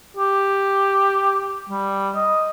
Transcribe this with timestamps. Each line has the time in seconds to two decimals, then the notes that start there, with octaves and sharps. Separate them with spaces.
0.17 G4
1.69 G3
2.15 D#5